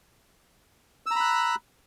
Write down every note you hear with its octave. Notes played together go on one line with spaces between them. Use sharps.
A#5 B5 E6 F#6